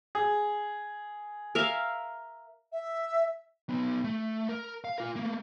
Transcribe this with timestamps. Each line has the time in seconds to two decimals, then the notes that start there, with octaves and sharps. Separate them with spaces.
0.15 G#4
1.55 A#4 E5 F5
2.72 E5
3.69 B3 D#4
4.04 A3
4.49 A#4
4.84 F5
4.98 F4 A#4
5.16 A3 A#3